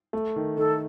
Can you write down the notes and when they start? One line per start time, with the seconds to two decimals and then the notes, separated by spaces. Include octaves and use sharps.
0.13 A3
0.36 D#3
0.57 D#3 A4